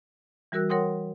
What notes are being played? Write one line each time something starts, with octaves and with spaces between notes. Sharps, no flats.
E3 G3 F#4 A#4 E6 F#6
A#4 C#5 F#5 G5 C6 D#6